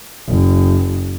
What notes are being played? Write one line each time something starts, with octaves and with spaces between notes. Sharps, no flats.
F#1